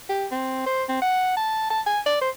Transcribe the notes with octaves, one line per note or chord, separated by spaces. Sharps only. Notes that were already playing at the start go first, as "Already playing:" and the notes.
G4
C4
C5
C4
F#5
A5
A5
G#5
D5
C5